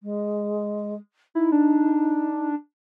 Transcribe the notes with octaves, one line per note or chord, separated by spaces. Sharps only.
G#3
D#4 E4
D4